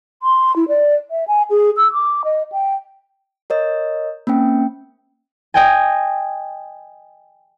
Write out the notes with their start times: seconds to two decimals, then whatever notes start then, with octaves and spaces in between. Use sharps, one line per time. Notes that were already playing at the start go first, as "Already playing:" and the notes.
0.23 C6
0.56 E4
0.68 D5
1.11 E5
1.28 G#5
1.50 G#4
1.77 E6
1.93 D6
2.25 D#5
2.52 G5
3.50 A#4 C#5 D#5
4.27 A#3 C4 C#4 G5
5.54 D#5 G5 G#5